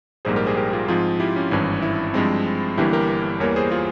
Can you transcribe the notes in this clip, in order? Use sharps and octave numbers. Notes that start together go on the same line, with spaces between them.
A#1 G#2 G3 A#3 G#4 C5
G4 A#4
G#4 C5
G4 A#4
F4 G#4
G#2 F3 C4 F4 G#4
E4 G4
C#4
G#1 G2 E3 C#4
E4
G2 F3 G#3 C4
G1 G2 E3 A#3 E4 G4
G4 A#4
E2 E3 G3 A#3 A#4 C#5
G#4 C5
F4 G#4